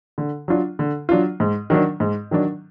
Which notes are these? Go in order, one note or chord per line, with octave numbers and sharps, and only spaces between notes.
D3
F#3 D4 F4
D3
F#3 D4 F4
G#2
D#3 F#3 D4
G#2
D#3 F#3 D4